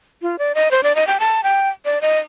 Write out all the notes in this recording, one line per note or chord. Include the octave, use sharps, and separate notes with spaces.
F4
D5
D#5
C5
D5
D#5
G5
A5
G5
D5
D#5